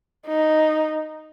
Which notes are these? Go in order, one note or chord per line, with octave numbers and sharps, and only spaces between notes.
D#4